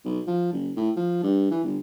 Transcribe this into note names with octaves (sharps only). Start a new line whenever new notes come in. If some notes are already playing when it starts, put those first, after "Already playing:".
B1
F3
F#1
A2
F3
G2
E3
G1